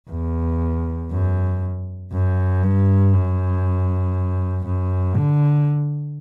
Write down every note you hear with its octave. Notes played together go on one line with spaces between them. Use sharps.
E2
F#2
F#2
G2
F#2
F#2
D3